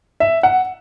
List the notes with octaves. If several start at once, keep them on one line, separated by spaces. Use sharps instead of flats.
E5
F#5